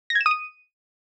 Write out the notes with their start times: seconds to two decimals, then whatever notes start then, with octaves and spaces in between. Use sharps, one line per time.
0.10 A#6
0.15 G#6
0.21 E7
0.26 D#6
0.31 D#7